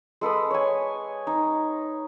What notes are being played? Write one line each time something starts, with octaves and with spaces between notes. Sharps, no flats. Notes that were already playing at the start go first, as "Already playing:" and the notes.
G#3 A4 B4 D#6
C#5 G#5
D#4